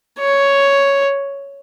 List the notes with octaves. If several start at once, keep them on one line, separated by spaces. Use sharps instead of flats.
C#5